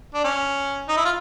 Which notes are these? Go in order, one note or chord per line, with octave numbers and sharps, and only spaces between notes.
D4
C#4
D#4
E4
F4